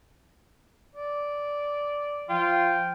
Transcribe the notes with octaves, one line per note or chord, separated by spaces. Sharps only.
D5
F3 F4 G5